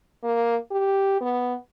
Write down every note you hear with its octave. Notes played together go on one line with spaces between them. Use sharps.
A#3
G4
B3